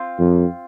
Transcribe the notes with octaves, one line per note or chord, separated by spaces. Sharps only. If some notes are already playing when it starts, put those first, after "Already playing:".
Already playing: C4 F4
F2